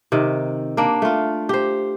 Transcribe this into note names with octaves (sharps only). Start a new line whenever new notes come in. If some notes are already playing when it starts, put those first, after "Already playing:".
C3 D#3
A#3 D4
A3 F4
G4 C5